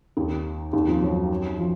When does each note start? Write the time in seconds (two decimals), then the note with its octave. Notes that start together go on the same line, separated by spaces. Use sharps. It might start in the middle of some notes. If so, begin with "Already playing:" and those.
0.17 D#2 D#3
0.73 D#2 D#3
0.87 F2 F3
1.02 F#2 F#3
1.58 F3